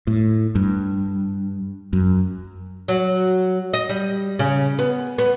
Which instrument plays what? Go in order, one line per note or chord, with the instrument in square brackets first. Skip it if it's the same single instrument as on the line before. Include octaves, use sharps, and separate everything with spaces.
[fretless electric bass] A2
G2
F#2
[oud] F#3
D#5
G3
C#3
B3
B3